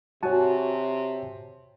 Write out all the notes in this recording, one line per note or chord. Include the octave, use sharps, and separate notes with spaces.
C3 F#4 C#5 G#5 A5